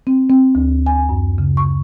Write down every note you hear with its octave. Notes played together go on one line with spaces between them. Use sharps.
C4
C4
D2
G#5
F#2
C#3
C#6